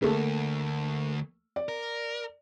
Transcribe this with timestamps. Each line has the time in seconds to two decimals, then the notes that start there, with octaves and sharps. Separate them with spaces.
0.02 D2 A3 A#3
1.56 D5
1.69 A#4